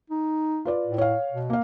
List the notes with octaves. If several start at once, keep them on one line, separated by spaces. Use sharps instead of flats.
D#4
F4 B4 D5
A2
C#5 F5
B2
A#3 F5